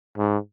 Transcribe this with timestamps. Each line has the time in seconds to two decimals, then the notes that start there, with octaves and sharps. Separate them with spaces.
0.18 G#2